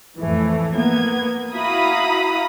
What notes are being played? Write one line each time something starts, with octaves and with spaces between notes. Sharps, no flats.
F2 A2 E3 A3
A#3 B3 G#6
E4 F#4 F5 A#5 B5 D#6